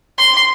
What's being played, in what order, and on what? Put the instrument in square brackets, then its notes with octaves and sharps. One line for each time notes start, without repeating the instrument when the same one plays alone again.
[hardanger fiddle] C6